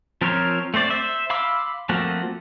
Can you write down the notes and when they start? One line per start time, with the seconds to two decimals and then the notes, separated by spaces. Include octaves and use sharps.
0.21 F3 C4 A#4 C5 C#5
0.74 A3 C4 C5 D5
0.90 C5 E5
1.30 F5 B5 C6 D6 E6
1.89 F3 A3 A#3 C4 F#4